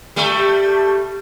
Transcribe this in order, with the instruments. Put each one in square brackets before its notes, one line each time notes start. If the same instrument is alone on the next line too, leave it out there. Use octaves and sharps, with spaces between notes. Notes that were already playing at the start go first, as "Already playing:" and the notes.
[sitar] G3 A3